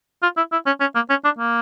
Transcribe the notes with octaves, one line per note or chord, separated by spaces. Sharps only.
F4
E4
E4
C#4
C#4
A#3
C#4
D4
A#3